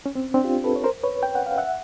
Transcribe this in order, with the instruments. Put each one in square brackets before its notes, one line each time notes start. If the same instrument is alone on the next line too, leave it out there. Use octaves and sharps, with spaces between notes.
[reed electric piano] C#4
C4
C4 D4
F4 G4
A4 B4
C#5
A#4 C5
B4 C#5
G5
F#5
F5
E5 F#5